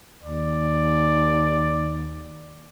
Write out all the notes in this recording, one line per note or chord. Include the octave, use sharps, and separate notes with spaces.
D#2 D5